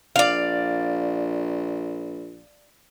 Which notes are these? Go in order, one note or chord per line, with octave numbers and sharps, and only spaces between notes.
A#1 D5 F5